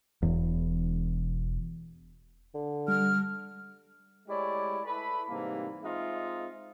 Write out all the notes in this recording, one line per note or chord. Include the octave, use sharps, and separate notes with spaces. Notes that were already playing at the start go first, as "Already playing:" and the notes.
E1 E2
D3
G3 F6
G#3 A3 E4 G4 C#5 D5
E4 A4 B4 B5
G#2 C3 E3 G3 A#3
G#3 C4 D#4 F4 E5